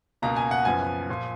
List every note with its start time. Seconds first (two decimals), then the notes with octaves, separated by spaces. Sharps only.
0.22 C#2 B2 A#3 A#5
0.36 G#5
0.51 F#5
0.65 F#1 F#2 F3 B3 G#5
1.09 A#2 F3